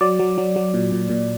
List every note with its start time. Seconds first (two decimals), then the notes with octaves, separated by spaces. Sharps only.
0.01 F#3 D5
0.19 F#3
0.38 F#3
0.56 F#3
0.74 A#2
0.92 A#2
1.09 A#2